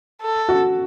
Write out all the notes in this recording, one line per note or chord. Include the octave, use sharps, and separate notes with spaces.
A4
F#4